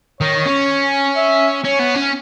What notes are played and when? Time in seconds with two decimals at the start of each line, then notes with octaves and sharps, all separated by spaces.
0.21 D#3 C#5
0.46 C#4
1.16 E5
1.64 C#4 C#5
1.80 B3
1.96 C#4